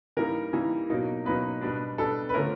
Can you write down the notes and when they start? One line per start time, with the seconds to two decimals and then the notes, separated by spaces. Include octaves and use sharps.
0.17 E3 G3 A#3 D#4 A#4
0.53 E3 G3 A#3 D#4
0.90 B2 F#3 A#3 D#4
1.25 B2 F#3 A#3 D#4 B4
1.61 B2 G3 B3 D4
1.98 B2 G3 B3 D4 A4
2.29 B4
2.34 D3 F3 A3 C#4 A#4